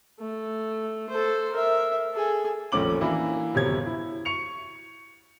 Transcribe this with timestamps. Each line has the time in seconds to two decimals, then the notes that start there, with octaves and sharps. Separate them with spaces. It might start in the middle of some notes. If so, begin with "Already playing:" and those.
0.20 A3
1.09 A4 C5
1.53 A#4 E5
2.13 G#4 A4
2.72 F1 A#1 A3 C#4 D6 F#7
3.01 E3 A#3 D4 E4
3.54 G1 F#2 C3 G4 C#5 G#6
3.86 E4
4.25 C#6 C#7 F7